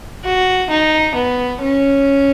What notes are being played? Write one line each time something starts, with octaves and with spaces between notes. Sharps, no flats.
F#4
D#4
B3
C#4